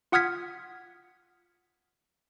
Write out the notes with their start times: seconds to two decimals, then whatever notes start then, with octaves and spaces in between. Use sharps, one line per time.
0.12 F4 F#5 D#6 F6 G#6 B6